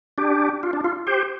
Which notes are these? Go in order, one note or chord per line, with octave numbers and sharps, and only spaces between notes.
D4 G4
F4
D4
F4
G4 C5